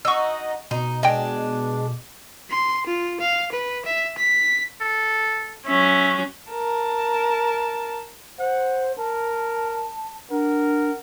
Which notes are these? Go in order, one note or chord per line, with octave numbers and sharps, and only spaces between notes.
D#4 F#4 D#5 C#6 E6
B2 D#4
G#3 D4 D#5 G5
C6
F4
F5
B4
E5
B6
A4
F#3 C#4 E5
A#4 A5
C5 F#5
A#4 A5
D4 A#4 F#5